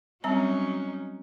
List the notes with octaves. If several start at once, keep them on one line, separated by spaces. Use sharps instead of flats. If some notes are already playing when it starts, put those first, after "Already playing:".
F#3 G3 C4 C#4 D#4 A#5